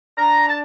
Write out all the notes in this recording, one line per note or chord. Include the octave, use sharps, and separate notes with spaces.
D4 A#5
A5